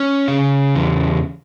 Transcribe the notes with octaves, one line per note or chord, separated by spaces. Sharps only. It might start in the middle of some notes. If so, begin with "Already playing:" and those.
Already playing: C#4
C#3
E2